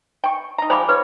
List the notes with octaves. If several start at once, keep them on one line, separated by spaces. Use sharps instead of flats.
G5 C#6
D#4 A#5
F3 G#3 G4 C5 B5 D6
D#3 F4 B4 C#5